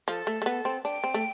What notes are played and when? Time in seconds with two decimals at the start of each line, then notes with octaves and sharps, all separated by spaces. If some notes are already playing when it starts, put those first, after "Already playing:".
0.08 F3 A4
0.27 A3
0.42 A3
0.46 B3
0.65 C4
0.85 D4 G5
1.04 C4
1.14 A3